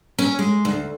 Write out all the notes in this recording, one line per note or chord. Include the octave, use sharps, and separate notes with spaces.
C#4
G#3
D2